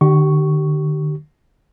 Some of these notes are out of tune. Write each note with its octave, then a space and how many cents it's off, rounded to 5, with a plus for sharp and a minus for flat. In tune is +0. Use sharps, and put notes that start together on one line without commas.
D3 +40 G4 -30 C#6 +0